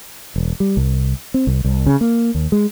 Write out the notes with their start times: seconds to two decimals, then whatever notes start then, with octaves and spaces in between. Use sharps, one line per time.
0.36 E1
0.60 G3
0.77 C2
1.34 C4
1.47 C2
1.64 C2
1.86 C#3
2.01 A#3
2.35 D#2
2.52 G#3